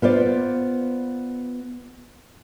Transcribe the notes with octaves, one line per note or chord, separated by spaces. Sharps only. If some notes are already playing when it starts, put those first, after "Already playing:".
B3 F4 C5 D5